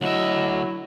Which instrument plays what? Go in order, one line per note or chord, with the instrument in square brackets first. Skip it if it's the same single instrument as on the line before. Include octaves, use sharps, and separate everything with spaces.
[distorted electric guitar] D2 E5 [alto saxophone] F#3 [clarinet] E4 [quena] D#5